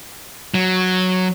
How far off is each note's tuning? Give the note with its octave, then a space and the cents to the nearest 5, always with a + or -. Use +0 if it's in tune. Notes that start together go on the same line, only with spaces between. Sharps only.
F#3 -5